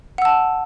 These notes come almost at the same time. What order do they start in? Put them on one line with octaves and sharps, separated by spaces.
F#5 E6 A5